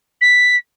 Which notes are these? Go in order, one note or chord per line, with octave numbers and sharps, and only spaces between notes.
B6